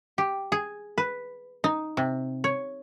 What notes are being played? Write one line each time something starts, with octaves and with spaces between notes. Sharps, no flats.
G4
G#4
B4
D#4
C3
C#5